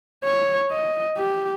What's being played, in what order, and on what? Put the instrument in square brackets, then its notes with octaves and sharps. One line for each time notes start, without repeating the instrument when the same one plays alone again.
[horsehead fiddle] C#5
D#5
G4